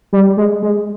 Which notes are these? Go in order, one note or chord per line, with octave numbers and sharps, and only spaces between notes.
G3
G#3
G#3